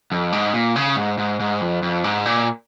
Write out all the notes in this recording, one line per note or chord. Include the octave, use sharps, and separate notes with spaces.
F2
G#2
A#2
C#3
G#2
G#2
G#2
F2
F2
G#2
A#2